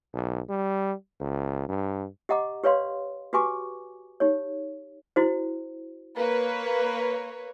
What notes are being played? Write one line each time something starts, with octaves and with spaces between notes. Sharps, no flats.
B1
G3
C#2
G2
G4 D#5 F#5 A#5 D6
G4 B4 C#5 D5 F5 C6
F#4 G4 B4 G#5 C#6 D6
D#4 G4 C#5
E4 F#4 C5
A#3 B4 C#5